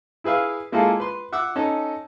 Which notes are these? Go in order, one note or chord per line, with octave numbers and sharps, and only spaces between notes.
E4 G#4 B4 E5 F5
G#3 A#3 E4 F4 G#4 A4
B4 C6
E5 F#5 D6 E6
C#4 D#4 A4